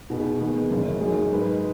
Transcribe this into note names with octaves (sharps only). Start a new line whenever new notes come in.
B2 B3 D#4 G#4 B4
D#3 B3 G#4
F#1 F#2 C#3
F#2 F#3 D#4 G#4
G#2 G#3 D#4 B4 D#5